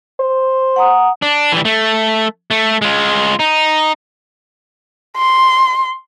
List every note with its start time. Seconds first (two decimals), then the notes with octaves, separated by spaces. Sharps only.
0.20 C5
0.76 F#5 A#5 D#6
1.22 D4
1.52 E3 G3
1.65 A3
2.51 A3
2.82 G#3 F4
3.39 D#4
5.18 C6